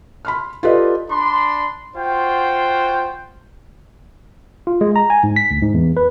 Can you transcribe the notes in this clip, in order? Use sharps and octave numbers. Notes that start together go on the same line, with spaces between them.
B5 C6 F6
F4 G4 A4 B4 D5 D#5
D4 D5 B5 C6
F4 F#4 C5 F#5 G5
F4
G#3
A#5
G#5
G#2
B6
D2
G#2
E2
B4